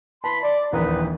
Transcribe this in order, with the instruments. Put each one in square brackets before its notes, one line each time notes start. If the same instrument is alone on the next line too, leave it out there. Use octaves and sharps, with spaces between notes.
[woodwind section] E3 B5 C6 [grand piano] A5
[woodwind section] D5
[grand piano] D#1 A#1 E3 [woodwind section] A#2 D#4 B4